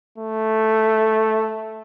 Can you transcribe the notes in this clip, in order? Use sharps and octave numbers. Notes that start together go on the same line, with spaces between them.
A3